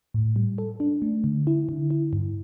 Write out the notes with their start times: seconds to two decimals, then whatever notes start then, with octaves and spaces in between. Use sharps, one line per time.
0.14 A2
0.36 G3
0.58 A4
0.80 D4
1.02 A3
1.24 D3
1.47 E4
1.69 D3
1.90 E4
2.13 G2